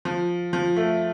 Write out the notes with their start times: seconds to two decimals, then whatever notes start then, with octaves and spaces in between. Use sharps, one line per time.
0.05 F3
0.53 F3
0.76 A3